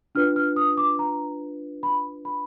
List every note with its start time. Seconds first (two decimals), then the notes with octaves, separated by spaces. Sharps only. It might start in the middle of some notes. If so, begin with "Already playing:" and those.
0.15 D4 F4 B4 F6
0.36 F6
0.56 D#6
0.77 D6
0.99 A#5
1.83 B5
2.25 B5